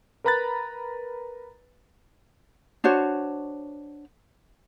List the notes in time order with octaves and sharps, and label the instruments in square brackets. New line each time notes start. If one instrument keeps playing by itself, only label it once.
[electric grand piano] A#4 B4 A#5 B5 F#6 A6
[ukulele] D4 F#4 C5 C#5